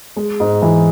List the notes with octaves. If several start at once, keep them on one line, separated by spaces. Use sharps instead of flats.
G#3
G#2
E3